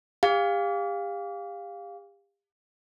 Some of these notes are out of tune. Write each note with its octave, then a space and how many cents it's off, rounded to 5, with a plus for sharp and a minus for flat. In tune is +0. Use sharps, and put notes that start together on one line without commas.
G4 +35 F5 +10